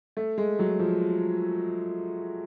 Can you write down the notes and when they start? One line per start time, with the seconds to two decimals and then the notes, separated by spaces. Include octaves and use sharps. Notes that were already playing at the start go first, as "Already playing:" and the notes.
0.17 A3
0.38 G#3
0.59 F#3
0.79 F3